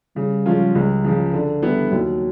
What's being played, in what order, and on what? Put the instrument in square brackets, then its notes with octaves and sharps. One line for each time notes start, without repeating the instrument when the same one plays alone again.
[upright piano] C#3 [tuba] G3
[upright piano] F3 G#3 C#4 F4
C#2
C#3 F3
D3
G3 B3 E4
[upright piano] D#2 [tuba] F#3